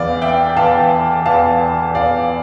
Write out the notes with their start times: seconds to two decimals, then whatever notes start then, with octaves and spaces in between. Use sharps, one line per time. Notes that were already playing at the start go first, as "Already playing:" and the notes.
Already playing: E2 E3 D5 F5
0.22 E5 G5
0.56 E2 E3 F5 A5
1.26 E2 E3 F5 A5
1.95 E2 E3 D5 F5